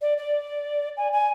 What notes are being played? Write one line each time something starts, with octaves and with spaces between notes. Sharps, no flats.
D5
D5
G#5
G#5